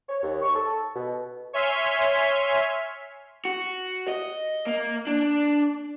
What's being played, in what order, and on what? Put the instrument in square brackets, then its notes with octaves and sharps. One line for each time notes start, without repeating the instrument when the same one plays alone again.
[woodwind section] C#5
D#2
C#6
A4
B2
[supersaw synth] C#5 E5 G#5 C6 F6 B6
[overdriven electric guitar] F#4
D#5
A#3
D4